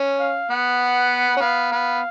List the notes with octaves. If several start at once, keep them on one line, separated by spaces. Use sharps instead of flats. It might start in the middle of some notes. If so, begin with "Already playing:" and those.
Already playing: C#4
F5
B3 F#5
C#4
B3 F5
B3